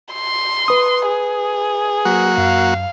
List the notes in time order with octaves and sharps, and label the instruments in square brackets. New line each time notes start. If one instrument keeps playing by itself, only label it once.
[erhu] C6
[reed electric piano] B4 D#6
[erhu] G#4
[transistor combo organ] F#3 A#3 F#4
[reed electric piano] F#2 [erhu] F5